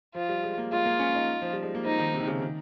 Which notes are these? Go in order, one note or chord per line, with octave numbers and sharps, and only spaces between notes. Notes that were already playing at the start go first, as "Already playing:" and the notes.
F3 F4
G3
G#3
A#3
G#3 F4
A#3
C#4
D#4
F3
G3
G#3
A#3
C4 D#4
D#3
C3
D#3
C#3
D#3